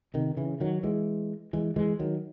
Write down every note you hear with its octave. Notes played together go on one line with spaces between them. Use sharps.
C3 D#3
C#3 E3
D#3 F#3
E3 G#3
E3 G#3
E3 G#3
D#3 F#3